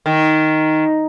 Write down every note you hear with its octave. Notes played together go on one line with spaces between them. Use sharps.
D#3